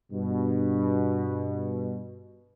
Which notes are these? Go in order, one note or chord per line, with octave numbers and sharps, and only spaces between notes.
G2 B2